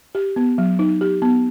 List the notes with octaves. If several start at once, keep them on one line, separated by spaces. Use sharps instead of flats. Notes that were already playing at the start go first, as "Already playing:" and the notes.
G4
B3
F#3
D#4
G4
B3